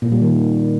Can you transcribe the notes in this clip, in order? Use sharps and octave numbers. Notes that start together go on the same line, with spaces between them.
A#2
G3
D#3